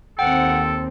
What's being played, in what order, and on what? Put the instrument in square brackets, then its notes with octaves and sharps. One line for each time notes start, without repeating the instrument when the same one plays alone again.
[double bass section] D#2 C4 [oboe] A4 [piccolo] F#5 [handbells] G5